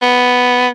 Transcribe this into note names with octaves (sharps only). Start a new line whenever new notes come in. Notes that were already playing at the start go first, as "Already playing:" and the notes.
B3